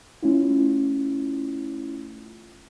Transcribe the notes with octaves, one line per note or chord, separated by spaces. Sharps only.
A3 C#4 E4 F4